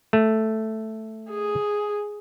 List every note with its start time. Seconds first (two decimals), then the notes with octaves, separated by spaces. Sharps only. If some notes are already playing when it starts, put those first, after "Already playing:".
0.13 A3
1.30 G#4